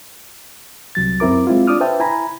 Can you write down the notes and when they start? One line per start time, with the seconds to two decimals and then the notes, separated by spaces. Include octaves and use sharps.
0.95 C2 F#3 A6
1.20 F#2 C4 E4 A#4 D6
1.47 G#3 C4 E4 F4
1.67 D4 F4 D6 D#6 F6
1.80 B4 C5 E5 G5 A5
2.00 E4 G#5 A#5 B5